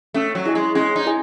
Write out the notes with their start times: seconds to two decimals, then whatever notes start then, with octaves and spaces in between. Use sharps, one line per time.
0.14 A3 C#4
0.35 F#3
0.46 E4 G#4 D#5 G#5
0.55 G#3
0.75 G#3 C#4
0.96 D#4
1.06 E4 G#4 D#5 G#5